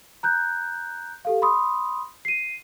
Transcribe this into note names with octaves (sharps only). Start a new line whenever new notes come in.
A#5 F#6 G6
G4 A4 F5
B5 C6 D#6
C7 D#7